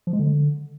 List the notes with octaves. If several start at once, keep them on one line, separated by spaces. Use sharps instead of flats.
F3
G#3
D3